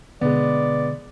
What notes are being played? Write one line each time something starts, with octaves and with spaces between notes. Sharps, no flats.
B2 D3 G#3 B3 D5